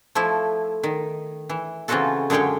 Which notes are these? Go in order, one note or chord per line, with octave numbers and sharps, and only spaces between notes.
F3 A3 E4
D#3
E3
C#3 E3 C4 F4 F#4 A4
F#2 D3 G#3 C#5 F5 G5